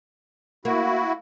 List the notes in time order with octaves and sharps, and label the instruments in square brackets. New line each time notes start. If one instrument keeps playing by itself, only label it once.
[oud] A#3 [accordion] E4 F#4